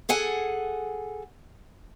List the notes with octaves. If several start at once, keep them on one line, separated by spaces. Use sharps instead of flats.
G#4 A4 F#5 G#5